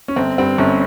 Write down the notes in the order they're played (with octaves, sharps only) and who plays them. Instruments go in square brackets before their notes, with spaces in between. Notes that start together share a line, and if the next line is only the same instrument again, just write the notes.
[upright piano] C#4
G1 C4
G2 C4
G1 C#4